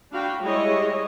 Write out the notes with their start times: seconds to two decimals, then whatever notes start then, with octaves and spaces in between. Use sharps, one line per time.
0.11 D4 F#4 F5 G5 B5
0.43 G3 G#3 E4 G#4 C#5 D#5